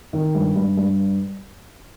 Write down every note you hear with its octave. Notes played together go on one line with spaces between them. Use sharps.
D#3
G2
G2
G2